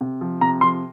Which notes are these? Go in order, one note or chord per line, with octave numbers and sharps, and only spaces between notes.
C3
F3
C3 A#5
F3 C6